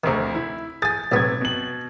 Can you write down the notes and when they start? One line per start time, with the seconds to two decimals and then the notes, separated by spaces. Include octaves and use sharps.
0.04 F1 D2 C3 D#3 A#5
0.35 E4
0.82 G#4 G#5 A6
1.12 B1 A2 C3 B3 G#6
1.41 B2 F#7